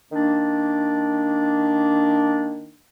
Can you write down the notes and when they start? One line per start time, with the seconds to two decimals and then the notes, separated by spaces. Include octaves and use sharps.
0.10 D#3 A#3 D4